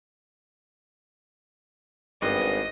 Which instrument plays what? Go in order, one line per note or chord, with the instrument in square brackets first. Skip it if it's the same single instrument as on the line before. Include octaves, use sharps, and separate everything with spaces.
[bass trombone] G#1 [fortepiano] G2 B3 [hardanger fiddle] D#5